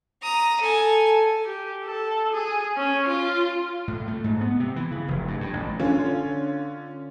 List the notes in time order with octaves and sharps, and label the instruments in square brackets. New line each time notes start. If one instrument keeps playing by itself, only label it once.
[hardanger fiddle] A#5 D#6
A4 G#5
[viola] G4
A4
G#4
C#4
F4
[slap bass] A2
A3
G#2
B3
C3
E3
C#3
F1
G2
G2
A1
[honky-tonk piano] D3 C#4 F4